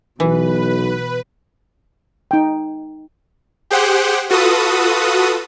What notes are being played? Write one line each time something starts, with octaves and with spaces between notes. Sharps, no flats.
B1 B2 E3 B4
D#4 G5
G4 G#4 C5 F#5 G5
F4 F#4 A4 B4 D#6